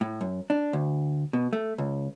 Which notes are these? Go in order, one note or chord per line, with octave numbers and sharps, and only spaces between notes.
A2
F#2
D4
D2
B2
A3
C#2